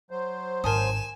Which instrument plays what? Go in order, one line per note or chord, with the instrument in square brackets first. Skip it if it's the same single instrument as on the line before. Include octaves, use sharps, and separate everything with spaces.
[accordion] F#3 C5
[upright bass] G#1 [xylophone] A#4 A5 D#6 [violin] G#5 E7